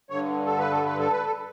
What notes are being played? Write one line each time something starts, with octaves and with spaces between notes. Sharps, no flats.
G2 D3 C#5
A4
B4
A4
B4
A4
B4
A4